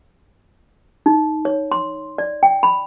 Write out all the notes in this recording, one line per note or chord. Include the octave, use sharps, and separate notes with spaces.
D#4
C#5
C6
D5
G5
B5